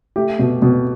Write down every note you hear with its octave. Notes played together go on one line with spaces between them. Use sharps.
A3 G4
B2
B2